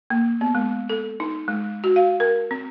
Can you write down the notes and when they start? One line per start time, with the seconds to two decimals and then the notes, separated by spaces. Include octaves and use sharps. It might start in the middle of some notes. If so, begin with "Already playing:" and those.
0.10 A#3
0.41 B3
0.55 G#3
0.89 A4
1.20 D#4
1.48 G#3
1.84 F#4
1.96 F5
2.20 A#4
2.51 C4